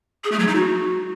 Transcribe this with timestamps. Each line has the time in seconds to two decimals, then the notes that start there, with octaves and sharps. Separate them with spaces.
0.24 G#4
0.32 A3
0.40 F#3
0.47 D#4
0.55 F#4